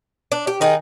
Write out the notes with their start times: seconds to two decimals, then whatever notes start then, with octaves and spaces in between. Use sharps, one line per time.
0.32 D4
0.47 G4
0.61 D#3 D#4 G#4